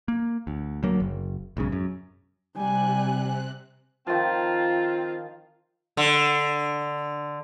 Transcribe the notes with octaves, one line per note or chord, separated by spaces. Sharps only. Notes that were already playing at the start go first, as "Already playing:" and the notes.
A#3
D2
D2 F#3 A#3
F#1
B1 G#2 C#3
F#2
C3 G3 G#5 F#6
D#3 F3 C4 F4
D3